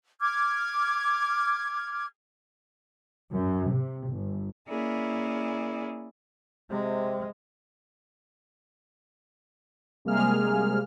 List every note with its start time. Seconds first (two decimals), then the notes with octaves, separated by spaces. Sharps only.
0.20 D6 F6 G#6
3.32 F#2
3.69 C3
4.08 G1
4.69 A#3 C#4 E4 G#4 A#4 D5
6.71 C3 G#3
10.05 C3 G3 G#3 A#3 G#4 F6